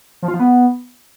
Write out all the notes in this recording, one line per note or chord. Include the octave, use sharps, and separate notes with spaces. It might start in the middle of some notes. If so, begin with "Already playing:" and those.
F3
F4
F3
B3